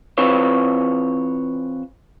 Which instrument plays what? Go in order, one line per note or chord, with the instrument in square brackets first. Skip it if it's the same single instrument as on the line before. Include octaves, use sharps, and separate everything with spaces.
[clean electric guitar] E3 C4 F4 B4 C#5